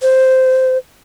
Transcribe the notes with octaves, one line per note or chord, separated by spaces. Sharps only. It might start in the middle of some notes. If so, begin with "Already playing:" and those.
C5